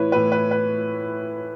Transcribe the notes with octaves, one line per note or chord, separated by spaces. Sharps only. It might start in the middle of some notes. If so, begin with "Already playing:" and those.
Already playing: A2 E3 E4 B4 C#5
A2 E3 B4
B4
B4